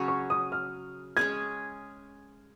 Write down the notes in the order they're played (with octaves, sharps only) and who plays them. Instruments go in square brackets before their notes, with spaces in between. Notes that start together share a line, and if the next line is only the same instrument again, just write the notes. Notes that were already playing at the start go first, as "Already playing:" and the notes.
Already playing: [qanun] C#3 F#3 C#4 F#4
[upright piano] C#6
D#6
F6
[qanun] G#3 C#4 G#4 [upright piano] G#6